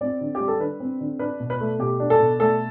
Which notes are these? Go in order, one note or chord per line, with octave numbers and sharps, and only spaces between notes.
C4 D5
D3
G4
G3
A4
D3 B4
C4
D3
D4 B4
B2
B4
A3
B2 G4
D4
A4
B2
A3 A4